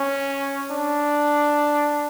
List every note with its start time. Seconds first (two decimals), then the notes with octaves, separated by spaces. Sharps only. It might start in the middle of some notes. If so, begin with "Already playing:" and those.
Already playing: C#4
0.71 D4